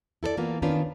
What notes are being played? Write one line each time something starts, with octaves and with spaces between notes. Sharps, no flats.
E4 A4 A#4 D5
E3 A#3 B3 F4
D#3 B3 C#4 D4 F4 B4